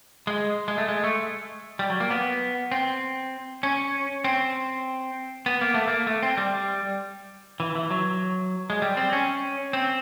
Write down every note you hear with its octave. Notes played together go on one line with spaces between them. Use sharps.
G#3
G#3
A3
G#3
A3
G3
F#3
A#3
B3
C4
C#4
C4
B3
A#3
A3
A#3
A3
C4
G3
E3
E3
F#3
G#3
G3
C4
C#4
C4